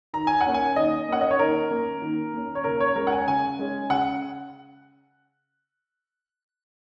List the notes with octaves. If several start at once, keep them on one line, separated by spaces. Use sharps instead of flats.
D#3 A#5
G#5
F#5
A#3 C#4
G#5
D#3 D#5
A#3 C#4 F#5
D#5
C#5
D#3 A#4
A#3 C#4
D#3
A#3 C#4
C#5
C#3 A#4
C#5
G#3 A#4
C#4
F#5
G#5
C#3 G#5
G#3 C#4
C#3 F#5